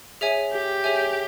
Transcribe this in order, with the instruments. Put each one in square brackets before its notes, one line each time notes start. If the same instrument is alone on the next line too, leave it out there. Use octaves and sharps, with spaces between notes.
[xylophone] G#4 C#5 E5 G#5
[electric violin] G4
[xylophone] G#4 C#5 E5 G#5